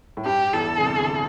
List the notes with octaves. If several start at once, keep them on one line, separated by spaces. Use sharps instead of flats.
A2
G2 G4
E2 E3 A4
D3
C2 C3
D2 D3